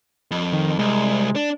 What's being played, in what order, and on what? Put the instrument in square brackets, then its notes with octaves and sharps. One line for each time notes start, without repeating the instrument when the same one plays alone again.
[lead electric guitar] F2
[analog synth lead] D#3
[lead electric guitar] C2 [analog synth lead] G#3
[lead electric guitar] D4